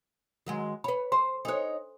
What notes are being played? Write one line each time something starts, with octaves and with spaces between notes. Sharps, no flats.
D#3 F#3 G#3
B4 C#5 B5
C5 C6
D4 D#4 A4 C5 C#5